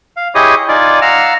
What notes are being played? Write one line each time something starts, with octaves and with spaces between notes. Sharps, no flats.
F5
E4 G4 G#4 C#5 D#5 D#6
D#4 F4 D5 G#5
F5 F#5 A#5 E6 F6